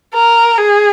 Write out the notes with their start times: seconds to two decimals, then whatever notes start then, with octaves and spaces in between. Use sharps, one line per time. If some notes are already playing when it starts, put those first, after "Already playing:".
0.14 A#4
0.58 G#4